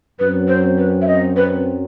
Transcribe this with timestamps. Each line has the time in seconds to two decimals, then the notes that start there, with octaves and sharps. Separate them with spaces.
0.19 F#2 F#3 C4 B4
0.48 C5
0.77 B4
1.02 E5
1.07 D#5
1.36 B4